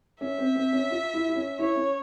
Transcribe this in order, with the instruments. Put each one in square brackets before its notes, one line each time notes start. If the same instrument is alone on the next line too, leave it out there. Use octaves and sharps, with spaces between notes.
[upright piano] C#4 [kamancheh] E5
[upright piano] C4
C4
C#4
F4
E4
E4
C#4
[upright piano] E4 [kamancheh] C#5
[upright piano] C#4